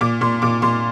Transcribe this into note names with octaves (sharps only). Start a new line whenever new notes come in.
A#2 D6
A#2 C6
A#2 D6
A#2 C6